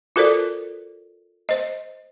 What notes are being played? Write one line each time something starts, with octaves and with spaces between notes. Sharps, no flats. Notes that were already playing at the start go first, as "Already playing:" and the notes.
F4 F#4 A4 A#4 C5 D5
C5 D#5